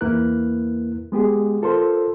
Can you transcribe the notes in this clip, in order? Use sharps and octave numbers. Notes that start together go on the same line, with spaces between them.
E2 A#3 E4 A#4 B4 F#6
G#3 B3 G4 G#4
F4 A4 A#4 C5 C6